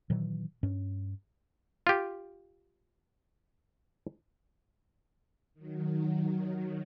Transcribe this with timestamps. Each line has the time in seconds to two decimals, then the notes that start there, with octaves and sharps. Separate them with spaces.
0.10 A#2 D#3 E3 F#3
0.63 G2 C#4
1.87 F4 G4
5.54 D#3 F#3